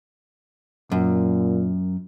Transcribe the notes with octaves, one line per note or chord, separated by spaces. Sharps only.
F#2 A#2